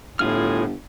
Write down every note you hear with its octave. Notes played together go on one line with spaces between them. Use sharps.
G1 A2 F4 G#4 F6